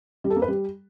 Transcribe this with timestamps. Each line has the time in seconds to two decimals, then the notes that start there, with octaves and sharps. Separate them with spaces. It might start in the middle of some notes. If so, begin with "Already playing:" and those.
0.24 G3
0.30 A4
0.36 A#3
0.42 B4
0.48 G3